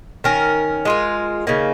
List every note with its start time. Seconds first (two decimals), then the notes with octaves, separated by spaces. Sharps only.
0.24 D#3 C#4 A#4
0.85 G#3 F4 A#4
1.47 C#3 A#3 D#4